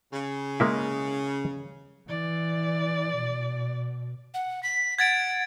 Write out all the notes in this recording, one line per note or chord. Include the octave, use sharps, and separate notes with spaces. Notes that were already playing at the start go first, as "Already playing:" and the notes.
C#3
G#3 A#3 E4
E3 D5
B2
F#5
B6
F#5 G#6 A6 D7